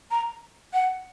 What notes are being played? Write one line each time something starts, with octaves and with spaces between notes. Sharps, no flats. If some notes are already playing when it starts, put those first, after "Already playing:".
A#5
F#5